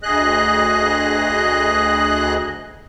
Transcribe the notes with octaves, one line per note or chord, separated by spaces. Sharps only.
D2 G#4 D#5 F#6